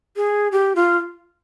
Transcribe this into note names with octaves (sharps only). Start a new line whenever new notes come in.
G#4
G4
F4